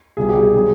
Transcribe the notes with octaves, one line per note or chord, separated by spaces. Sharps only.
C2 B2 G3 G#4
G4
G#4
D3 F#3 B3 G#4